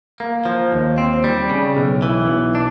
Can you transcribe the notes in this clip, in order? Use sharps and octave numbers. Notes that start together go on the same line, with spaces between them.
A#3
F3
D#2
C4
G3
C#3
B1
E3
B1
D4